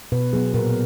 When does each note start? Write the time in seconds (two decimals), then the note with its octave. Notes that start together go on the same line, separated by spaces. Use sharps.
0.12 B2 B4
0.33 F#3 B3 G#4
0.54 A#2 A#4